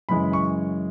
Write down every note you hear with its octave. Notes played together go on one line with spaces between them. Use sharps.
F#2 C#3 E3 G#3 B5
C#6